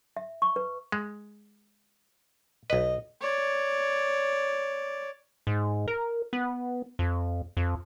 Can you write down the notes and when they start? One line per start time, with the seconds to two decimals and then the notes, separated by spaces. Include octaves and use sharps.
0.17 E5
0.42 C#6
0.56 B4
0.92 G#3
2.70 B1 B4 D#5
3.21 C#5 D5
5.47 G#2
5.88 A#4
6.33 B3
6.99 F2
7.57 F2